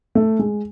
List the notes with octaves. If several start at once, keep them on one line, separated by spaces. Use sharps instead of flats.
A3
G#3